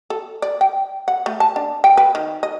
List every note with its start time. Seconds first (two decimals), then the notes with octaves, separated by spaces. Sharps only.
0.10 A4
0.42 D5
0.61 G5
1.08 F#5
1.26 A3
1.40 A5
1.56 D4
1.84 G5
1.97 B4
2.15 D#3
2.43 D#5